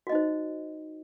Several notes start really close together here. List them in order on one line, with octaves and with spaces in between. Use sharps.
F#4 D#5 D#4 C5